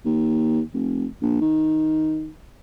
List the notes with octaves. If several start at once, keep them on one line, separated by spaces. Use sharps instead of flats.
D#2
F1
A#1
D#3